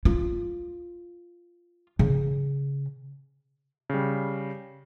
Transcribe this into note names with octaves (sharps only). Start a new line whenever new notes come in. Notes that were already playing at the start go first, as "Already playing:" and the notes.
F4
C#3
C#3 G3